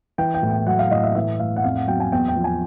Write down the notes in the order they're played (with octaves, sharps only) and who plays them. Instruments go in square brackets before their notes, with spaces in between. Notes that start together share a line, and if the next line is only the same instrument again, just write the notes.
[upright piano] E3 G5
G5
A2
G5
F#3 F#5
F5
A2 D#5
E5
E3 E5
A2 F5
F#5
F2 F5
F#5
F#3 G5
G#5
E2 G5
G5
F3
G#5